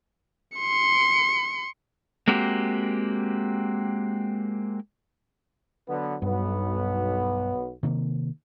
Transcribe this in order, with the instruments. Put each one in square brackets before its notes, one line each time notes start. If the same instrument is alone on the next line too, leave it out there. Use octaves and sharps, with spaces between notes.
[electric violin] C6 C#7
[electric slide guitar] G#3 A#3 C4 F#4 G4
[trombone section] D3 F#3 B3
[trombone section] B1 B3 [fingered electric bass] G2
[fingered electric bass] C3 D#3 A#3